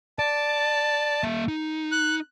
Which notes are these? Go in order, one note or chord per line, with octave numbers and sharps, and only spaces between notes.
D5 A5
A#3 E5
D#4
F#6